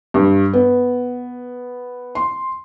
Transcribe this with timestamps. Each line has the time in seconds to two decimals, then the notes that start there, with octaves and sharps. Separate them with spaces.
0.14 G2
0.53 B3
2.15 C6